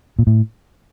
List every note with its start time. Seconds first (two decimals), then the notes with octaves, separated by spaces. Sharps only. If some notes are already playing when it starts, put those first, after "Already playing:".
0.19 A#2
0.27 A2